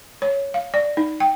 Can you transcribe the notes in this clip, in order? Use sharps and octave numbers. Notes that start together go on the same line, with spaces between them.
C#5
F5
D5
D#4
G5